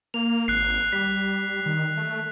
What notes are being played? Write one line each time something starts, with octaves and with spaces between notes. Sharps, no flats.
A#3 F7
G#1 F#6 C7
G3 B6
D#3
A3